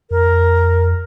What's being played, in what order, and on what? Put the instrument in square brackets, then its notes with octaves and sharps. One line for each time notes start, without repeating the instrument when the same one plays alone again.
[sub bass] F2 [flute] A#4